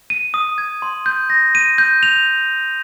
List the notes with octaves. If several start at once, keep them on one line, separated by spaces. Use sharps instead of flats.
D#7
D#6
G#6
C6
G6
A#6
D#7
G6
F7